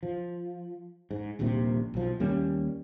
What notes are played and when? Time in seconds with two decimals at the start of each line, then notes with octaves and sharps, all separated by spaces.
0.03 F3
1.11 G#2
1.39 D#1 A#1 D#2 C3
1.94 B1 F3
2.20 D#2 G3 A#3 C#4